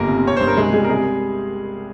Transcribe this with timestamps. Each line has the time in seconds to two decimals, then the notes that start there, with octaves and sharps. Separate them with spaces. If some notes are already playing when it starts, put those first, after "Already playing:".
Already playing: G1 G3 A#3 A#4
0.08 C3
0.25 C4 C#5
0.37 G2 C5
0.47 A#4
0.57 C2 G#3 G#4
0.73 G3 G#3 G#4
0.85 A#4
0.89 C3 G#3 G#4